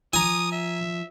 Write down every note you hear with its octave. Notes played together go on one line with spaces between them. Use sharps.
F3 G#5 A#5 D#6
E5